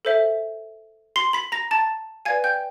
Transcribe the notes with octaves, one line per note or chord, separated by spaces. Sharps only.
A4 C5 E5
C6 C7
B5 B6
A#5 A#6
A5 A6
B4 D5 F5 G#5 G#6
G5 G6